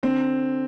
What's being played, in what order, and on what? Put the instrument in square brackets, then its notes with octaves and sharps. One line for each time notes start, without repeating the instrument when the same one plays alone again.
[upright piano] D3 C4